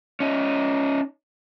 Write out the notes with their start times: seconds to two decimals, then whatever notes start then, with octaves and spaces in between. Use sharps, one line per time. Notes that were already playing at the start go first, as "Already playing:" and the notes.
0.20 C#4 D#4